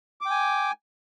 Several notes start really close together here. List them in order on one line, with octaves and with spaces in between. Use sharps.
D6 G5 G#5